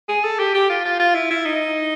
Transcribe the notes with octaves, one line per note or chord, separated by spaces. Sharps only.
G#4
A4
G4
G4
F4
F4
F4
E4
E4
D#4